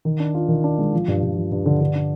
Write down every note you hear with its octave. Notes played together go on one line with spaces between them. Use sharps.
D#3
D4
F4
D#3
D4
G#3
F3
G2
G2
F3
G2
D3
D3
D4